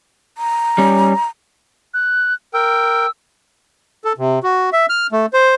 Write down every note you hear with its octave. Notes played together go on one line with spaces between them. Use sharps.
A#5
G3 C#4
F#6
A#4 G5 E6
A4
C3
F#4
E5
F6
A3
C5